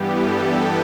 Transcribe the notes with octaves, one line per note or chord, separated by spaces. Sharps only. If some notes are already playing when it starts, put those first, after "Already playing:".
Already playing: G2 E3 G3 B3 G4
A4